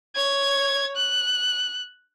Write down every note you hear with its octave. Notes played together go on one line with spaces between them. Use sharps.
C#5 G#6
F#6